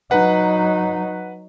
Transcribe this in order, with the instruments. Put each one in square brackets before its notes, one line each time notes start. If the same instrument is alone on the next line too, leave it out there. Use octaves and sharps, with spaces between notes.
[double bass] F#3 D#4 [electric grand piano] B4 F#5